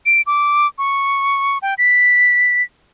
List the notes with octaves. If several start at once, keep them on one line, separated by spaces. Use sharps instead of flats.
D7
D6
C#6
G5
B6